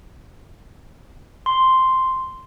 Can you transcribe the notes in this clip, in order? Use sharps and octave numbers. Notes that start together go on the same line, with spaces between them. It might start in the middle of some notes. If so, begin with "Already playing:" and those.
C6